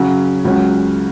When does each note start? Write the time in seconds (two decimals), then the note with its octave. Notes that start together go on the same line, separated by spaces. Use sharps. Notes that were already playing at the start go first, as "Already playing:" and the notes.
Already playing: C#3 F#3 C#4
0.45 C#2 C#3 F#3 C#4